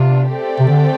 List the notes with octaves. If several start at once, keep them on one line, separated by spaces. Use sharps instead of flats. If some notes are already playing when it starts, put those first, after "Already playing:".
Already playing: C3 B3 D4 F4
A3 C4 G4 D5 G5
C3
D3